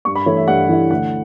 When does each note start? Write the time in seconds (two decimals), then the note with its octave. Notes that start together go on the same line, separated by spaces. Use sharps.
0.05 G2 C#6
0.15 B5
0.26 E3 A3 E4 C#5
0.37 E5
0.48 G2 F#5
0.69 E3 A3 E4
0.91 D2 F#5